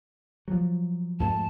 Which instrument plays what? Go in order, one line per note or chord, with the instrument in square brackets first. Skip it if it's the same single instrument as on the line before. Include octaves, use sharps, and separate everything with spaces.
[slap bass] F3 F#3
[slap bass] F2 G#2 A3 [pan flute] A5